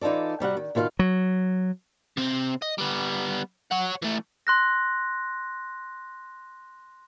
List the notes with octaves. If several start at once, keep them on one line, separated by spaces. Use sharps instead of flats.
E3 D#4 F4 A4 D5
C3 G3 F#4 F#5
D#3
B2 D#3 F4 D5 F5
F#3
C3 C4
D#5
G3 B3
C#5 F#5
E3 A3
C6 F#6 A#6